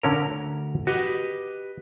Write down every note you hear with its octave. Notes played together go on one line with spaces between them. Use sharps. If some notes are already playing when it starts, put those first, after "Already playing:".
D3 C#4 A#4 A#5
D2
F#4 G4 B4 D#5